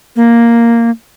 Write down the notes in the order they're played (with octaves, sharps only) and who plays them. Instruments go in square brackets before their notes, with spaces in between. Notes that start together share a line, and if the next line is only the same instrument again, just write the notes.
[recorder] A#3